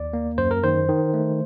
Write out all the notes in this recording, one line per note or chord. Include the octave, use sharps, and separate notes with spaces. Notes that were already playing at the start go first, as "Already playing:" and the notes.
Already playing: D#2 D5
A#3
F#2 C5
A#4
D#3 C5
D#3
A3